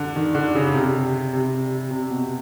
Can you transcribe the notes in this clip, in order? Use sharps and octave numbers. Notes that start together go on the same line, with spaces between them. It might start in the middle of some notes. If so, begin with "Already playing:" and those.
Already playing: D3
D#3
D3
C#3
C3
C3
C3
B2